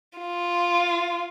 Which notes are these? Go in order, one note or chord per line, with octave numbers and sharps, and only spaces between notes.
F4